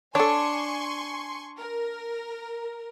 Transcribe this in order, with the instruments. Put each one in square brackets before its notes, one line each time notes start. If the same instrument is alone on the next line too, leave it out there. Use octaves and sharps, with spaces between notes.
[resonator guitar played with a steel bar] D4 [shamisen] A4 C#5 [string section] G#5 C6 C#6
[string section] A#4